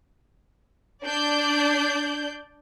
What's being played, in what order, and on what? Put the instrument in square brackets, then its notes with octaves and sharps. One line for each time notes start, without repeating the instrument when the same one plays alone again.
[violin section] D4 D5 G6